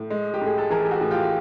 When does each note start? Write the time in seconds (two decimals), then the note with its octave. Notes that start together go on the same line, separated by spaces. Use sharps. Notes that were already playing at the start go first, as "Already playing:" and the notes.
Already playing: A2
0.10 G#3
0.34 G4
0.41 A2
0.46 G#4
0.58 A4
0.70 E3 G#4 A#4
0.85 G4
0.91 F#4 G#4
1.01 A2
1.11 F4 G4